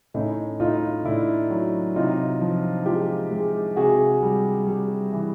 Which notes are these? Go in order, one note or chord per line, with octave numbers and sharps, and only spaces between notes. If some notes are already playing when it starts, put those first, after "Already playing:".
A2 C#4 D#4
A2 D#4 F4
A2 D4 E4
F#3
C3 D#4 F4
F3
G#3 F4 G4
G#3
C3 F#4 G#4
G3
G3
E3